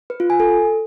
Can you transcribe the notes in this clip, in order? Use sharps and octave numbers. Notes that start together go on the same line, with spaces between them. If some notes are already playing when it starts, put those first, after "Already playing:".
B4
F4
G#5
A4